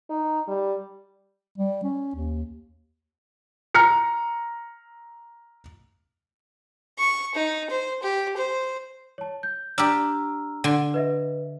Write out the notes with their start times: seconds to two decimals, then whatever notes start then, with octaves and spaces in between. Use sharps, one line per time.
0.10 D#4
0.48 G3
1.58 G3
1.84 C#4
2.15 D#2
3.75 A#5 F6 C#7
6.98 C#6
7.34 D#4
7.70 C5
8.02 G4
8.36 C5
9.18 C#5 A5
9.43 G6
9.78 D4 G4 A#5 E6 F6
10.64 D3 G#5 C6
10.94 B4 D#5 E5